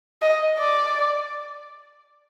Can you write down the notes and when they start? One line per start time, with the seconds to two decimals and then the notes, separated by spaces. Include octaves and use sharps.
0.22 D#5
0.58 D5